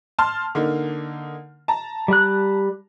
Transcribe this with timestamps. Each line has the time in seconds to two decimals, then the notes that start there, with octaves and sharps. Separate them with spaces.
0.19 A5 C6 F6
0.55 D3 A#3 D#4
1.68 A5 A#5
2.08 G3 F#6